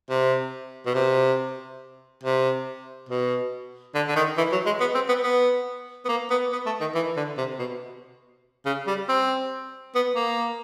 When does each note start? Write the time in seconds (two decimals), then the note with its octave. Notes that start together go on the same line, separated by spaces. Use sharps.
0.10 C3
0.86 B2
0.95 C3
2.23 C3
3.09 B2
3.95 D3
4.08 D3
4.16 D#3
4.38 E3
4.52 F#3
4.66 G#3
4.80 B3
4.95 C4
5.09 B3
5.23 B3
6.05 B3
6.09 A#3
6.31 B3
6.53 B3
6.66 A3
6.81 D#3
6.95 E3
7.16 D3
7.38 C3
7.59 B2
8.66 C#3
8.87 G3
9.09 C4
9.95 B3
10.16 A#3